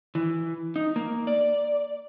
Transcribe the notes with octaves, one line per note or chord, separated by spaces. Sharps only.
E3
D#4
A#3
D5